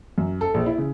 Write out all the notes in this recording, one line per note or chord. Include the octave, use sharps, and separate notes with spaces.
F#2
A4
A#1
E4
C#3